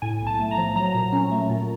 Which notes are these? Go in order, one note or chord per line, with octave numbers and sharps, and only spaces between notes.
A2 G#5
B1
A5
A3
A#5
F3
F#3 A#5
A#2
C#4
A3
A#2